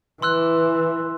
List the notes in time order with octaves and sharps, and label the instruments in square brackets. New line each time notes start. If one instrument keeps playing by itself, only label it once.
[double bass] E3 [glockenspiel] C6 E6 F#6